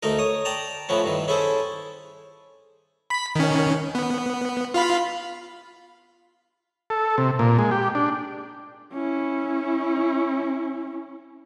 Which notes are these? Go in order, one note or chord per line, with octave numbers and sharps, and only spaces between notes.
D2 A3 D#4 A#4
C#5 D#6
D5 G5 A5 A#5
A2 E3 F3 B3 C#4
G2 D#3 E3
C#4 E4 G#4 A4 C5
B5 B6
D#3 C#4
B3
F4 F5 B5
A4
C3
A#2
G#3
G4
D4
C#4 E4